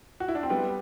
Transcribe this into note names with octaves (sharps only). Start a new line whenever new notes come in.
F#4
E4
D4
C4
G3 B3